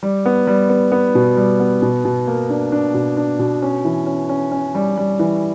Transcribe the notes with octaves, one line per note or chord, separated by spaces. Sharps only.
G3
B3
G3
B3
B3
B2
G3
B3
B2
B2
A#3
D4
D4
B2
D4
B2
C#4
E3
C#4
C#4
C#4
G3
G3
E3